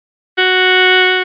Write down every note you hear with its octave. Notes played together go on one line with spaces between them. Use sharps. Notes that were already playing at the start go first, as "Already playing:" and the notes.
F#4